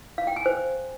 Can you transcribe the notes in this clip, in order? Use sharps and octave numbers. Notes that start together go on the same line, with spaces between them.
F5
G5
G#5
C5